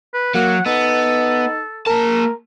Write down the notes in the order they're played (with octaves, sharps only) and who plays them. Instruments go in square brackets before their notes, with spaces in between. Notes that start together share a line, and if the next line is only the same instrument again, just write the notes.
[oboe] B4
[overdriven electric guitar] F#3 [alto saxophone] A#3 [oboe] F#5
[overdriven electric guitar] B3 [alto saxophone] D#4 [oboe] A4
[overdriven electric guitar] A#3 A5 [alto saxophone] A#4